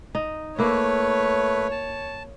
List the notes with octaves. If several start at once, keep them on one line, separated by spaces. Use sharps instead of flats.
D#4
A3 A#3 E4 B4 C#5
A5